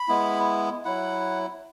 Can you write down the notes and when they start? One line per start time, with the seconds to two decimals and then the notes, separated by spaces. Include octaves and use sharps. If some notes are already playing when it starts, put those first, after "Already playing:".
Already playing: B5
0.08 G#3 B3 E4
0.85 F#3 E4 F#5